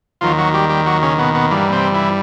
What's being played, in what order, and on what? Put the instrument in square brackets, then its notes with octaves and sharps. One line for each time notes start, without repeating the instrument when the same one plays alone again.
[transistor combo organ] D#2 D#3 F3 F#3 F4
F#3 F#4
G3 G4
G3 G4
F#3 F#4
C#3 C#4
B2 B3
B2 B3
G2 E3 G3 A#3
C3 C4
E3 E4